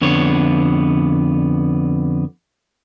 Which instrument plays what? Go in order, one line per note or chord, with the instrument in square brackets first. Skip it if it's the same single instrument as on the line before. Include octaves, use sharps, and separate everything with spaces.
[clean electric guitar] F2 D3 B3 C#5